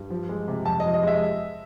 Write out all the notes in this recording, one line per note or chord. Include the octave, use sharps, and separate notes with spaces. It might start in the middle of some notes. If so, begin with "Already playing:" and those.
Already playing: G2
F3
G#3
C3
F2 A5
D#5
F3
D#5
G#3 E5